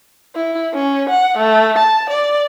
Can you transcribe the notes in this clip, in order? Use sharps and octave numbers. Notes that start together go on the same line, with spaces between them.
E4
C#4
F#5
A3
A5
D5